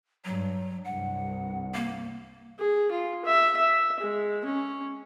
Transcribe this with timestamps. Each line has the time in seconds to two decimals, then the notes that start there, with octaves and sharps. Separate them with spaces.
0.25 G2 F#3
0.85 C2 G2 F#5
1.74 A#3
2.59 G#4
2.92 F4
3.25 E5
3.57 E5
4.00 G#3
4.45 C#4